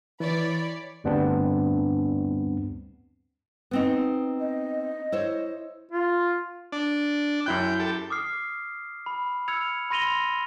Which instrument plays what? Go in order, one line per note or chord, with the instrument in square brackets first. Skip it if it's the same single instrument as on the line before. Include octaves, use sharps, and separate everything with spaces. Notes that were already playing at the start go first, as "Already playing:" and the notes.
[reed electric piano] E3 [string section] C#5 D5 B5
[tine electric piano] D2 G2 G3 B3 C4 D4
[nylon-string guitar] B3 C4 D#4
[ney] D#5
[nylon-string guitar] E4 C5 C#5
[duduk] F4
[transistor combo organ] D4
[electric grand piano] F#2 E4 F#6 [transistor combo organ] G5
[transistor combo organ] G4 A4
[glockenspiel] D6 D#6 F6 C7
B5
E6 F6 G#6 C#7 F7
B5 C6 A#6 D#7 F7 G7